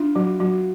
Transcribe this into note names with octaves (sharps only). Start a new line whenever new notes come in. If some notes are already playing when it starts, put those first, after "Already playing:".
Already playing: D4 E4 F4
F#3 F#4
F#3 F#4